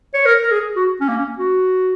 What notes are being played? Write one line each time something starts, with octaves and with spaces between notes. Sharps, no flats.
C#5
A#4
A#4
G#4
F#4
C#4
A#3
C#4
F#4